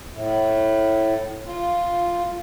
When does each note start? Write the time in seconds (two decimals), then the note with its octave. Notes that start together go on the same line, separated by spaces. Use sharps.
0.12 A2
1.45 F4